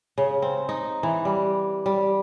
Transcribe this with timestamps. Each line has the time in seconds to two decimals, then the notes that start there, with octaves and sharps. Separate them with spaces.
0.18 C#3
0.42 C4
0.69 D#4
1.03 E3
1.25 G3
1.86 G3